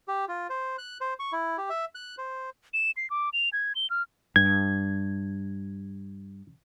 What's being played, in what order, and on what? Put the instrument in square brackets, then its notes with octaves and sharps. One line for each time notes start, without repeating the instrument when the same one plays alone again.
[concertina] G4
F4
C5
F#6
C5
C#6
E4
G4
E5
F#6
C5
[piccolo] E7
C7
D6
F7
G#6
G7
F6
[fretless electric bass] G2 [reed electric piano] G#6